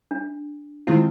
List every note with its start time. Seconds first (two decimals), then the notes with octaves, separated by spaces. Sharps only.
0.11 D4
0.87 D#3 G#3 C4 E4 F4